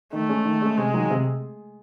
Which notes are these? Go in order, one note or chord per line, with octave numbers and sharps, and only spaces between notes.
D#3 A3
G#3 C#4
D#3
G#3 C#4
C3 G#3
D#3 F#3
C3